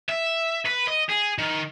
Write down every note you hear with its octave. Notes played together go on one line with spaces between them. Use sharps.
E5
B4
D#5
G#4
D#3